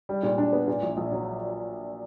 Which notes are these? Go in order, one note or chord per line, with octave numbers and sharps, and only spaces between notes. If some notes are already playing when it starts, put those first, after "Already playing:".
G3
A#2
D4
B3
A#2
A#1
A#1
F#3